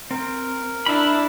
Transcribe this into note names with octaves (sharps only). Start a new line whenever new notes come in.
C4 A#4
D4 E4 E5 B5